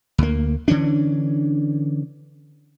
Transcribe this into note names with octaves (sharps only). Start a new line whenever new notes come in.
D2 A#3
D3 E3 C#4 D4